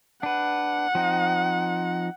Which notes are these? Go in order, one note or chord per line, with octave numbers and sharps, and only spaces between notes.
D4 B4 F#5
F3 C4 D#4